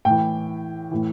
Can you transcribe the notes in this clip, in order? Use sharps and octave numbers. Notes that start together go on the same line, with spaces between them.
A2 E3 G5
A2 E3